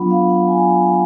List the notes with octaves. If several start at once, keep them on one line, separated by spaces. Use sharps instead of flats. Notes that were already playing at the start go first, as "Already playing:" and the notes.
Already playing: F#3 B3 D4 F4 F#5 B5
F5
F#5
G#5
F#5